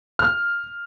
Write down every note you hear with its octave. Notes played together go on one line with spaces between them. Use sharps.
F6